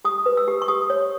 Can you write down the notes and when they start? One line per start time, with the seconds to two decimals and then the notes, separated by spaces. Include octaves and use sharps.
0.05 G4 D#6
0.26 B4
0.37 E6
0.48 G4
0.62 C#6
0.68 G4 D#6
0.90 C#5